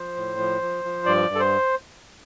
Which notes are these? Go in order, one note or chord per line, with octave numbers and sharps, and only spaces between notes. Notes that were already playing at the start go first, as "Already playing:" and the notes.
Already playing: F3 C5
A2
F3
F3
F3
G2 D5
G2
A4
C5